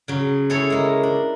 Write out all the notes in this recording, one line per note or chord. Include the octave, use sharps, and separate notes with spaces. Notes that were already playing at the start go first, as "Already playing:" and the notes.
C#3 F#3
E4 G#4 A4 C#5
G#3 A#3
D4